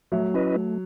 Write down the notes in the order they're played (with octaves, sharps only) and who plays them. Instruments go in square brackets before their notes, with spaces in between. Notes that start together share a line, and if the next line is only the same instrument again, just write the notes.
[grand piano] F#3 [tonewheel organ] A3
[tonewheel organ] C#4 E4 B4 D#5
A3